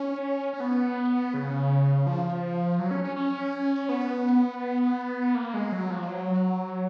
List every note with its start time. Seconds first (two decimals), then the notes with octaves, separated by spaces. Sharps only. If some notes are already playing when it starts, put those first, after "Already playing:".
Already playing: C#4
0.53 C#4
0.60 B3
1.34 C#3
2.07 F3
2.79 F#3
2.91 C#4
3.04 C#4
3.16 C#4
3.89 B3
5.35 A#3
5.54 G#3
5.72 F#3
5.90 F3
6.08 F#3